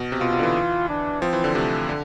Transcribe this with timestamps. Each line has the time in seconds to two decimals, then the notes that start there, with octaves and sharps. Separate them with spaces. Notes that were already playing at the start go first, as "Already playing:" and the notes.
Already playing: B2
0.12 C3
0.21 B2 F4
0.32 C3
0.39 D3
0.43 E3
0.89 D4
1.21 F3 C4
1.33 E3
1.44 D3
1.55 C3 A3
1.89 D3